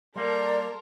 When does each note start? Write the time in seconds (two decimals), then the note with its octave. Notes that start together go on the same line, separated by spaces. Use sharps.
0.16 G3 A#3 A4 A#4 D5 C6